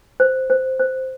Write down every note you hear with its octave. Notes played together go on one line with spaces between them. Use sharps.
C5
C5
C5